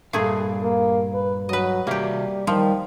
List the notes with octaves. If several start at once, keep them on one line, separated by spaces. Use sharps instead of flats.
G2 A#2 A3 G#4 F5
A#3
B4
F#3 B4 D#5
C3 G3 A#3 F#4 G4 E5
D#3 F3 G3